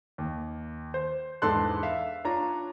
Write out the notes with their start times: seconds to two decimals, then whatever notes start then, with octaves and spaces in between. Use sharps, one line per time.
0.18 D#2
0.94 C5
1.42 E2 G#2 D4 A4 C6 F#6
1.83 E5 F5
2.25 D4 F4 C#5 A#5